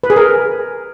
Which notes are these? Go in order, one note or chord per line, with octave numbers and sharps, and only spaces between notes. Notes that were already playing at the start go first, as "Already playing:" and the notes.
B4
G#4
A#4